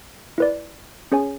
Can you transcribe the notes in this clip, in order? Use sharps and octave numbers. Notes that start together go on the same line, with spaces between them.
E4 B4 D5
C#4 G#4 C#5 G#5